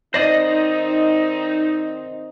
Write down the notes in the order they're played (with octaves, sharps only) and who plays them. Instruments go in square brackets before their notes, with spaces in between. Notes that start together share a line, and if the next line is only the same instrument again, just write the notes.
[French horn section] D#3 C4 D#4 [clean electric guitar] C5 D5 D#5 [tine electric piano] A#6